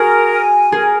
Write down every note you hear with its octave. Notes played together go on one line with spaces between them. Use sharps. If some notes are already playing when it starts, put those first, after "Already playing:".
Already playing: F#4 G#4 A#4
G#5
G#4 A#4